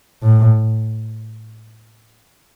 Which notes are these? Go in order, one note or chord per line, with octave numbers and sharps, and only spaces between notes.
A2